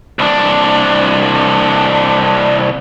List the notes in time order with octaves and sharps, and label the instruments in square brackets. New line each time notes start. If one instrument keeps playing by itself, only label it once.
[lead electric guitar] C2 D4